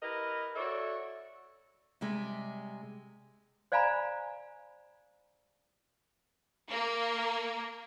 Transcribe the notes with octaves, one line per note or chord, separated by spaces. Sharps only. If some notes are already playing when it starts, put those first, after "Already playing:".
E4 G4 A#4 B4 D#5
F#4 A4 C#5 D5 E5
C3 G3 G#3
C5 D5 F5 G#5 A#5 B5
A#3